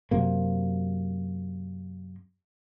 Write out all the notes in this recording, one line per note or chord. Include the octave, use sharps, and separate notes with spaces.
F#2 C3 A#3